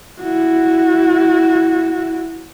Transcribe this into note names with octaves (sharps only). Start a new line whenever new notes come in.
E4 F#4